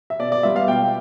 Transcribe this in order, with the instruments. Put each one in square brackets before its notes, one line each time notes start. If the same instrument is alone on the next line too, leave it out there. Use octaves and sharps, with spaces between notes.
[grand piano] E5
B2 D5
D5
G3 B3 F4 E5
F5
B2 G5